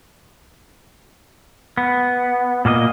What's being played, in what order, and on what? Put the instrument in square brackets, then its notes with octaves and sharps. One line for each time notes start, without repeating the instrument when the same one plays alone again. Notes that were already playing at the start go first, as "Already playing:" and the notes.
[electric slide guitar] B3
A#2 A#3 A4 D#5